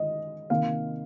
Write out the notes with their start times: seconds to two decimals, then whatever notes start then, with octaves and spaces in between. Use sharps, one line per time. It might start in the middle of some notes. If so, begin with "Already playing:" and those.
Already playing: D#3 G#3 D#5
0.50 C3 D#3 A#3 F5